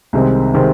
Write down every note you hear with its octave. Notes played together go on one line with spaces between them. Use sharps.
C2 C3 D#3 G#3 C4
C3 D#3 G#3 C4